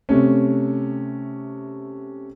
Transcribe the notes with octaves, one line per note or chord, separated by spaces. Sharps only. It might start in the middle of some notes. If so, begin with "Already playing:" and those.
C3 A3 C#4